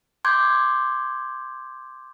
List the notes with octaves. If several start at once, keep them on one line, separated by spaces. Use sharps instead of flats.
C6 D6 G6 G#6